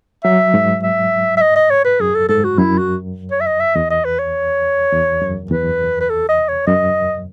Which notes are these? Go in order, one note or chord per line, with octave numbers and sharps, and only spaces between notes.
F#3 E5
G#2
E5
E5
D#5
D#5
C#5
B4
F#2 G#4
A4
G#2 A4
F#4
F#2 E4
F#4
C#5
E5
D#5
E5
E2 D#5
D#5
B4
C#5
E2
F#2
E2 B4
B4
A4
D#5
C#5
F#2 D#5